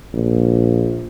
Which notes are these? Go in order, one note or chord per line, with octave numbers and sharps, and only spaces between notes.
A#1